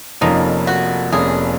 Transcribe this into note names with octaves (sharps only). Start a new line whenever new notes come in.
F1 F2 F3 A#3 C#4 D#4
F#4
F1 F2 F3 A#3 C#4 G#4